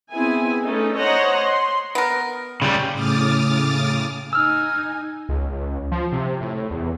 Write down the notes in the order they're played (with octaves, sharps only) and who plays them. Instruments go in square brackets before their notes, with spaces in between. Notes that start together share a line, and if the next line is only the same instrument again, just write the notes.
[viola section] B3 C4 E4 G#4 G#5
A3 C#4 D#4 A4
C5 C#5 D#5 F#5 A#5
C6
[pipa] B3 A#4
[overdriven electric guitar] C#3 G3
[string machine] A2 C#3 D6 D#6 F6 A6
[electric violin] D#4 G#5 [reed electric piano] E6 F6
[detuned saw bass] C#2
F3
C3
A2
E2